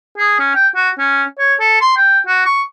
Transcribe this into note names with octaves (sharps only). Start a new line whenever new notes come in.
G#4
C#4
G5
F#4
C#4
C#5
A4
C6
G5
F#4
C#6